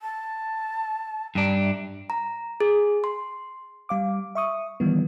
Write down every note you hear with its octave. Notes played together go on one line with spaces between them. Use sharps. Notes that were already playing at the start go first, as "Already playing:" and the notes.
A5
G2 D4 A#5
E5
A#5
G#4
C6
G3 F5 D6
E5 C#6 D#6
D#3 E3 G3 B3